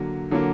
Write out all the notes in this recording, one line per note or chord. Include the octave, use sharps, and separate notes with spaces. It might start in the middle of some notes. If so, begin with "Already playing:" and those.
Already playing: D3 F#3 A#3
D3 F#3 A#3